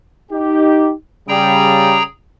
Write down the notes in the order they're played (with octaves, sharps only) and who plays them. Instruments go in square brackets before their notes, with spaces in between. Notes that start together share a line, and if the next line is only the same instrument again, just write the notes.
[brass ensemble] D#4 G4
[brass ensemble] C#3 G3 [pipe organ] G#4 G5 A#5